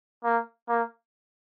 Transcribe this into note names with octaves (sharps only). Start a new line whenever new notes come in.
A#3
A#3